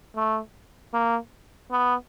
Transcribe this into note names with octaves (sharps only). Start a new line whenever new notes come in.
A3
A#3
B3